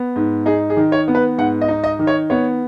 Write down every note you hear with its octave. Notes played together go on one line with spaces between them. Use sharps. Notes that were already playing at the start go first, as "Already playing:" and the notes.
Already playing: B3
G#2
D#4 G#4
G#4
D#3
C#5
B3
B4
G#2 F#5
D#5
D#4
D#5
D#3
C#5
B3 C#5